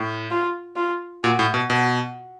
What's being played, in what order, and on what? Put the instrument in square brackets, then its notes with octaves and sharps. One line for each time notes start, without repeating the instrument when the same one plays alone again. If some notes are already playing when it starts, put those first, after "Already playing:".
Already playing: [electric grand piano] A2
[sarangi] F4
F4
[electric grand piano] A#2 [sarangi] F#4
[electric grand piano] A2
B2
[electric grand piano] B2 [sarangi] F#4